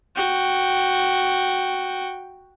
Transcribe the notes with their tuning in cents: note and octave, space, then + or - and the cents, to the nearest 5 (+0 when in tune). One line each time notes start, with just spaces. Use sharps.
F#4 +0 G5 +0